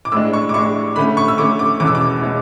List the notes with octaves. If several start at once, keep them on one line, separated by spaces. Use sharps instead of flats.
D6
A2 G#3 D4 E6
C#6
D6
A2 G#3 D4 C#6
D3 A3 C#4 B5
C#6
E6
D3 A3 C#4 D6
D6
E2 B2 G#3 C#4 D6
E6
D6
B2 G#3 C#4